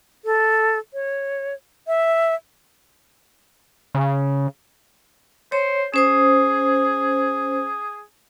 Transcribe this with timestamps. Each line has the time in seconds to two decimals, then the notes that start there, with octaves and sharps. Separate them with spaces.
0.25 A4
0.94 C#5
1.87 E5
3.95 C#3
5.52 C5 C#5
5.94 C#4 G#4 C5 D#6